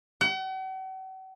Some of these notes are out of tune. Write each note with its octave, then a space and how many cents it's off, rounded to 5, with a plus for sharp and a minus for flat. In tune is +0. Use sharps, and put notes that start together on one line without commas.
F#5 +45